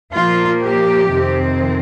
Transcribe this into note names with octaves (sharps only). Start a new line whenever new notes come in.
A#2 F3 A#3 F4
G4
F2 C3 D#3 C4